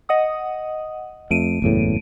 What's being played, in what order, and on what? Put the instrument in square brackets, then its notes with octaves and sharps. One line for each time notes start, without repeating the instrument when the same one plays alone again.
[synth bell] D#5 F#5 D#6
[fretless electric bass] F2 [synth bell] A3 D7 D#7
[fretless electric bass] F#1 E2 A2